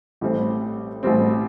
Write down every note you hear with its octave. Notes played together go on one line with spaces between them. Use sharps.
A1 A2 G3 C4
A1 A2 G3 C4